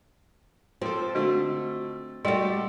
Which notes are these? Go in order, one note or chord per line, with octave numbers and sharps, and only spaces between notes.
F3 C4 A4
D3 A3 F#4
G3 A3 F#4 G4 A4 D#5